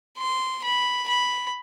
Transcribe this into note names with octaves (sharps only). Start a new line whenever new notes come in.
C6
B5
B5